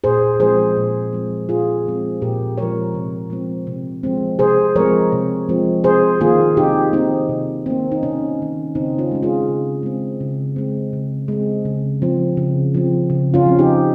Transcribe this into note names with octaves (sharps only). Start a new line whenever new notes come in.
A#2 G#4 C5
F3 G#3 C4 G#4 C5
A#2
F3 G#3 C4
A#2 F4 G#4
F3 G#3 C4
A#2 G4 A#4
F3 G#3 C4 A#4 C#5
C3
F3 G#3 C4
C3
F3 G#3 C4
C3 G#4 C5
F3 G#3 C4 A#4 C#5
C3
F3 G#3 C4
C3 G#4 C5
D#3 A#3 F4 G#4
C3 D#4 G4
D#3 A#3 C4 D#4
C3
D#3 A#3 C4
D#4
C3 C#4
D#3 A#3
C#3 C4 D#4
C#4 F4
G#3 C4
F4 G#4
C#3
G#3 C4
C#3
G#3 C4
C#3
G#3 C4
C#3
F3 C4
C#3
F3 C4
C#3
C#4 F4
F3 C4
D#4 G4